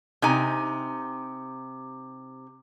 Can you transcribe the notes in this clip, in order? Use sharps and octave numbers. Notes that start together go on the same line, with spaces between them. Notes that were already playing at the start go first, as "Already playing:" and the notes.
C3 D#4 G#5